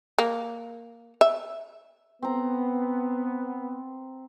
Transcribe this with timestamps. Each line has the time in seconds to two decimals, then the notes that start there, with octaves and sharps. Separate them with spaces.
0.19 A#3
1.21 E5
2.22 B3 C4 A#5